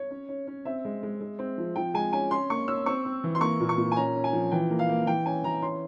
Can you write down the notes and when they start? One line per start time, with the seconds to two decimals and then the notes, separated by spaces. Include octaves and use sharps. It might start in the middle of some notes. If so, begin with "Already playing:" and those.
Already playing: C#5
0.11 C#4
0.29 C#4
0.47 C#4
0.65 C4 E5
0.85 G#3
1.03 G#3
1.21 G#3
1.39 C4
1.58 F3
1.76 F3 G5
1.94 G#3 G#5
2.13 C#4 G#5
2.31 C#4 C6
2.50 A#3 C#6
2.68 C#4 E6
2.86 C4 C#6
3.05 C4
3.24 E3
3.35 C6
3.41 A#3 C#6
3.60 A#2
3.69 C#6
3.78 A#2
3.92 G#5
3.97 C#4 A#5
4.15 C#4
4.24 G#5
4.33 F3
4.51 E3 G5
4.70 A#3
4.79 F5
4.89 A#3
5.07 E3 G5
5.26 C#4 G#5
5.44 E3 A#5
5.62 C#4 C6